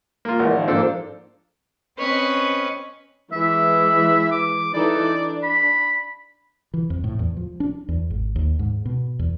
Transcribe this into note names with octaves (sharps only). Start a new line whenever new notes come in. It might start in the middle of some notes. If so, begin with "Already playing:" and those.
A#3 F4
A1 E3 G#3 A#4 C#5 F#5
D#3 F3 D5
G#2 F3 A#3 C4 D4 A4
C4 C#4 B4 C#5 D#5
E3 G#3 E5
D6
E3 D#4 A4 D5
D4
B5
E3
F2
A2
E2
F3
D4
E2
G#1
D#2
G#2
B2
E2